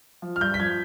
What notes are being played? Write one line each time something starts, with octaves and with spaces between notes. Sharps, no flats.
F3
F6
G2 G6
B6
F3 G#6